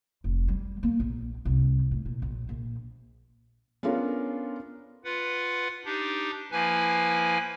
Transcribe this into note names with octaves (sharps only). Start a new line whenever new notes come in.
F1
G3
A#3
A#1
C2
A2
A#2
A#1
A#1
B3 C#4 D4 F4 A4 A#4
F4 B4 F#5
D4 D#4 G4
F3 A#3 E4 B4 G#5